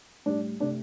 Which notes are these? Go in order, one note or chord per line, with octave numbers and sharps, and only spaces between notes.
A2 G3 D4
C3 A3 D4